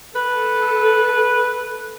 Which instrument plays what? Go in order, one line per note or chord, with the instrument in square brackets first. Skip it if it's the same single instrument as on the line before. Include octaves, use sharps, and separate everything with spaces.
[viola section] A4 [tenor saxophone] B4